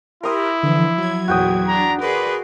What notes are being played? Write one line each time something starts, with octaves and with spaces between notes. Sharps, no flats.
E4 G4 A#4 C6 D#6
D3 E3 F3
F#3 G#6
E2 A#2 F#4 G5 D#6
D4 A#5
G#4 A#4 B4 D5 C6